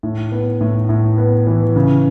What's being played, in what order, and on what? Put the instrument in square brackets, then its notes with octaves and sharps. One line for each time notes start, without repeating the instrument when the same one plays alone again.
[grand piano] A2
B3
A2
A2
B3
E3
C#3